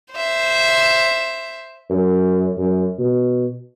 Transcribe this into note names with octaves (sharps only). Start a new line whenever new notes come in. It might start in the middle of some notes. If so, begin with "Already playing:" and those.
C5 E5
F#2
F#2
B2